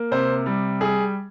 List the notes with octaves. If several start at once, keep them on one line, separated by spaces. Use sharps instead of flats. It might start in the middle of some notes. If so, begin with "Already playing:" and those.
Already playing: A#3
C3 C5
G3
G3 G#4